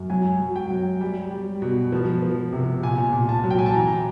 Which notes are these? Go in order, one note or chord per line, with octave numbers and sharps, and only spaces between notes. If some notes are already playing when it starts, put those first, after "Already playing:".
Already playing: F#2
F#3 G#5
F#3
G5
F#3
G3
G3
B2
F3
F3
C3
A#2 G#5
A#2
A5
F#3
G5
G#5
A5
E3 A#5